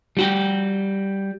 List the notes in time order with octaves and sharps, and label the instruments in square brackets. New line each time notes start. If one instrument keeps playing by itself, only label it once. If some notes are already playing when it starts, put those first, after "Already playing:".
[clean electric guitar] G3 F#4 G4